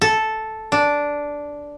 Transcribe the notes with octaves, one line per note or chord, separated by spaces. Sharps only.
A4
D4